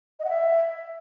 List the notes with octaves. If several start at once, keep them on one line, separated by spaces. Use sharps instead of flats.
D#5
F#5
E5